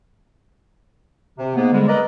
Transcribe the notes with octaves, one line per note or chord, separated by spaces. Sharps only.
C3
G#2 A#3 B3
G#2 D3 G3 G#3
A#4 B4 D5 D#5